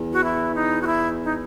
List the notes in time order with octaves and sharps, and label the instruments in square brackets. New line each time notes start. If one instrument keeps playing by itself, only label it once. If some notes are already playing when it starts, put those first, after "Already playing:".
Already playing: [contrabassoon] E2
[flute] F#4
E4
D#4
F#4
E4
D#4